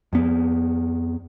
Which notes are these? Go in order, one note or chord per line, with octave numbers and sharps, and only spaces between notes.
F2 B3